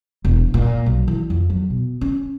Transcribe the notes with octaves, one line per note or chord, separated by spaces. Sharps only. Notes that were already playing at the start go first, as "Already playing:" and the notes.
E1
A#2
B1
E3
F2
F#3
B2
C#4